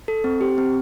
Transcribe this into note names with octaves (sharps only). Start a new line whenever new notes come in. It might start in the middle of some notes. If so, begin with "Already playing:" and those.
A4
C4
G4
C4